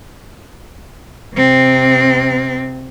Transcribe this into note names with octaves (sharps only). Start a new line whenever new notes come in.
C3 C4